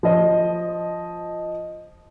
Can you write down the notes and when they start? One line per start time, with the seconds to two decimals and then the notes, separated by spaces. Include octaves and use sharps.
0.03 F3 D#5